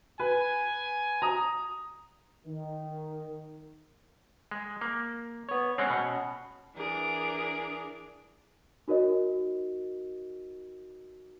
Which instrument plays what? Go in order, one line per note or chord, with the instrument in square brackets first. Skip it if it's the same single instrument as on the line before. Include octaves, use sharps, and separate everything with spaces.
[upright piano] B4 [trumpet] G#5
[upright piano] A#5 D#6
[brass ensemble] D#3
[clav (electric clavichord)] G#3
A#3
[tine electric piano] B3 C#5
[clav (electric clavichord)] G#3 C4 [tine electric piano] C#4 F#5
[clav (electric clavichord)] B2
[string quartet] E3 D4 G#4 A#4 D6
[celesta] D#4 F#4 A#4 C#5 D#5